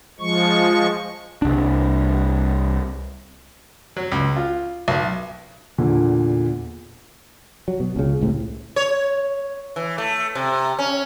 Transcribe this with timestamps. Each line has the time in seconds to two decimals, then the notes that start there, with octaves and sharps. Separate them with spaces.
0.20 F3 G#3 C#6
1.42 C2 D4
3.97 F#3
4.12 C#2
4.36 F4
4.88 B1
5.78 E2 A#2 D3
7.68 F#3
7.80 B2
7.96 C#2 C#3
8.21 C#2 A2 C3
8.76 C#5
9.76 E3
9.98 A3
10.35 C3
10.79 C#4